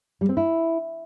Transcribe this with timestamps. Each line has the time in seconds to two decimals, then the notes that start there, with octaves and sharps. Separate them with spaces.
0.21 G3
0.29 C4
0.37 E4